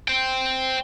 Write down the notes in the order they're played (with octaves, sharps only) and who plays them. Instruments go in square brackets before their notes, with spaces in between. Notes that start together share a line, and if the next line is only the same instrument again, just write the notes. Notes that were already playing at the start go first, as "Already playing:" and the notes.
[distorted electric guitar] C5 G5